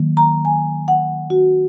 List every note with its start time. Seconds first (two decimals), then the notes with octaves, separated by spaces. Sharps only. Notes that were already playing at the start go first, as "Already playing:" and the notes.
Already playing: D#3 F#3 A#3
0.17 A#5
0.45 G#5
0.88 F#5
1.30 F#4